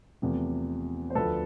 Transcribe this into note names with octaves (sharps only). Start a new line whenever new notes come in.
E2 C3 F3 A3
C5
D2 D3 F3 A3 A4 B4